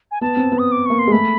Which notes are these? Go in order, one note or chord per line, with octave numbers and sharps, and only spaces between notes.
G#5
B3 A5
C4
B3
D#6
D6
A#3 C#6
C6
G#3
A3 B5